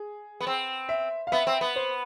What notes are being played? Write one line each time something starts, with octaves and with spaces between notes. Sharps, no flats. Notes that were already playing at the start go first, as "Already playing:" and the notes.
Already playing: G#4
B3
C4
E5
F5
B3 E5
C4
B3
C5